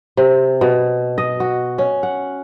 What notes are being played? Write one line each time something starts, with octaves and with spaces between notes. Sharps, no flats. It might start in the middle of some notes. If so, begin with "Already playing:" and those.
C3
B2
D#5
F#4
C#4
F#5